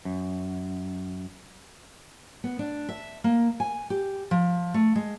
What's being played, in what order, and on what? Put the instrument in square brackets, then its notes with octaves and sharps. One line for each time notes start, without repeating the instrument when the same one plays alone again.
[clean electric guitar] F#2
[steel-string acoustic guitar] B3
D4
E5
A#3
G#5
G4
F3
A3
G#3